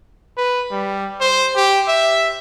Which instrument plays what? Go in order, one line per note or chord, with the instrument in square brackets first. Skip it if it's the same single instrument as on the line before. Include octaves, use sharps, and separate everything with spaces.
[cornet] B4
G3
C5
G4
E5